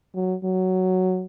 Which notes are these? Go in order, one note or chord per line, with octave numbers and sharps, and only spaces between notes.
F#3
F#3